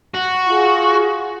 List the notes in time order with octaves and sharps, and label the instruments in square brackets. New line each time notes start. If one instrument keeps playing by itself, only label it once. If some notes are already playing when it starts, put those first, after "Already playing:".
[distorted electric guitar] F#4
[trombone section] F4 G#4